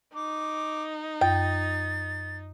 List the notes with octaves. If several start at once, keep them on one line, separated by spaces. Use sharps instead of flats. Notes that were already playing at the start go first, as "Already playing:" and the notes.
D#4 D6
F#2 G5 A6